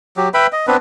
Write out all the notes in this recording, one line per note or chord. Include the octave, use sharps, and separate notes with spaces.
F#3 G4
B4 E5 G5 B5
D#5
B3 C4 D4 B4